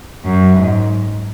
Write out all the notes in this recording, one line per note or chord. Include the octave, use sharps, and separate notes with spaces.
F#2
G#2